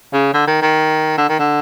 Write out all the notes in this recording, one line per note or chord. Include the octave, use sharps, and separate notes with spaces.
C#3
D3
D#3
D#3
D3
D#3
D3